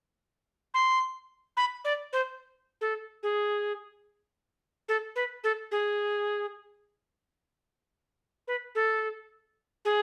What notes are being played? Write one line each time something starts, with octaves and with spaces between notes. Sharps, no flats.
C6
B5
D5
C5
A4
G#4
A4
B4
A4
G#4
B4
A4
G#4